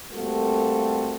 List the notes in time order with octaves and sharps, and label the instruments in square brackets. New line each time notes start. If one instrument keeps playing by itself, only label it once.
[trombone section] G3 A3 A#3 C4 F#4 A4